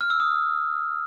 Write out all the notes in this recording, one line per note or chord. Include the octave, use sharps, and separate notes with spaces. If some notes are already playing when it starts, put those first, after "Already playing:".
F6
E6
D#6